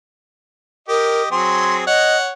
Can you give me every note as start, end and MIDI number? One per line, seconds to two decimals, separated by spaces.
0.88 1.27 67
0.88 1.23 70
0.88 1.27 75
1.31 1.86 54
1.31 1.86 60
1.31 1.86 68
1.31 1.76 84
1.87 2.32 73
1.87 2.17 75
1.87 2.32 78